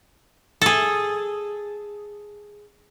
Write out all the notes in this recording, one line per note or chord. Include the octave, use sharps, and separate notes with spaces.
G#4 A4